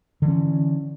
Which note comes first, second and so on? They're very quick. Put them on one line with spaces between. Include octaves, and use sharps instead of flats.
D3 E3 C#4